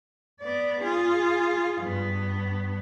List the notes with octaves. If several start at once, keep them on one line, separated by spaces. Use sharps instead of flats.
B3 D5
F4 G#4
G2 B3